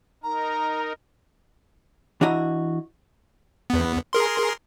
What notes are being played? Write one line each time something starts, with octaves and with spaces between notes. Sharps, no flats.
D#4 A#4 A#5
E3 D4 E4 F#4 D#5 A#5
E2 B3
G#4 A#4 C6